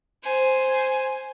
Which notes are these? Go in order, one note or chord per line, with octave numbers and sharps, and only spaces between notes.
C5 G#5